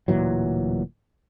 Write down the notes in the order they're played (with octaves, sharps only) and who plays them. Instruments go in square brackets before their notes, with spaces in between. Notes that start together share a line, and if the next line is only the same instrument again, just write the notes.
[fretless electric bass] D1 A#2 E3 F#3